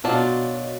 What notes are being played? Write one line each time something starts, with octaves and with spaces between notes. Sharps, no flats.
B2 D#3 F#3 D4 F4